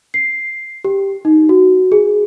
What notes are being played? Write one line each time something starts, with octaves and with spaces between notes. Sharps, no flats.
C7
G4
D#4
F#4
G#4